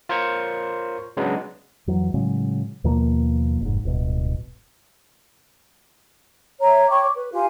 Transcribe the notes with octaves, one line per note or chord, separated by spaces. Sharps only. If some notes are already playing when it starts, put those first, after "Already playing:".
F4 A#4 C5 C#5 C#6
C#3 F#3 G#3 B3 C#4 D4
F2 E3 F#3
A2 C#3 F#3 G#3
D#2 B2 F3 A#3
F1 G#2
D1 G1 B2
C#5 E5 A#5
C#5 G5 C#6 D6
B4
F4 G4 F5 G#5